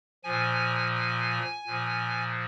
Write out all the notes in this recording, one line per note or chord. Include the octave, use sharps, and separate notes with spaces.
A#2 F3 G#5
G#5
A#2 F3